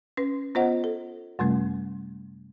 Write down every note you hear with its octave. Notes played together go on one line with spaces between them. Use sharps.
C#4 B4
B3 F4 C5 D#5 F#5
A4
F#2 C3 G3 A3 C#4